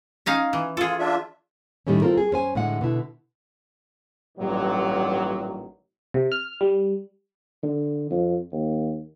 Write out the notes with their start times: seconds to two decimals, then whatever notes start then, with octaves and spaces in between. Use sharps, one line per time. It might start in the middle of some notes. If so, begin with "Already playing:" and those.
0.26 C#4 D#4 F5
0.53 E3
0.77 F4 G#4 A4
0.99 D4 F4 E5
1.87 A2 D#3 G3 A3 C#4
2.02 C4 F4 A4 A#4
2.17 G#4
2.31 F#2 C#4 C5 G#5
2.55 A2 D3 G#3 F#5
2.81 B2 D3 E4
4.38 A1 G2 A#2 D#3 F#3
6.14 C3
6.32 F6
6.61 G3
7.63 D3
8.11 F2
8.52 D#2